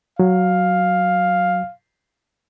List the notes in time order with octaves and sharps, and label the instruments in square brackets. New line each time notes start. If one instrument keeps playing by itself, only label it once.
[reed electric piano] F#3 [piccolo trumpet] F5